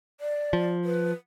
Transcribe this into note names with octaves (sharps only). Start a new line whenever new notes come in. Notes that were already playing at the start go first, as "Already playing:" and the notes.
D5
F3
B4